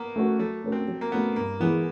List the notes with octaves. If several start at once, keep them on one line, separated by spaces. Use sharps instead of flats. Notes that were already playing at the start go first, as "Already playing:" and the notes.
Already playing: A#3 B3
A3 C#4 F#4 A#4
F#3 A3
A3 C#4 F#4 A#4
C4
F#3
A#3
A3 B3 C#4 F#4 A#4
G2 A#3
E3 G#3 B3